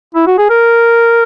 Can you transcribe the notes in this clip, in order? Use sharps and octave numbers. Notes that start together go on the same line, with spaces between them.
E4
F#4
G#4
A#4